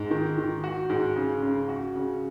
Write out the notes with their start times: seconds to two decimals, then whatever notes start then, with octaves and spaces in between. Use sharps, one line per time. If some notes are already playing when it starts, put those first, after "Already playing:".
Already playing: G#2
0.11 D#3
0.38 D#3
0.64 F#4
0.90 G#2
1.16 C#3
1.43 C#3
1.69 F#4
1.95 C#3